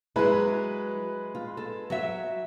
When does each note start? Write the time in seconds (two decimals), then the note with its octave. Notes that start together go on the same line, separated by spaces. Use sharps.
0.16 F#3 G#3 E4 B4
1.35 F4
1.57 A4
1.90 F#3 F#4 E5